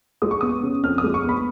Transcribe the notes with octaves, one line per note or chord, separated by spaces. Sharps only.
G#3 D#6
C#6
B3 D#6
C#3
F2 F6
D#6
G#3
C#6
B3 B5